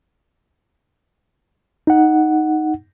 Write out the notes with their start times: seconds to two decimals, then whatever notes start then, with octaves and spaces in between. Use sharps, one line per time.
1.87 D#4 F#5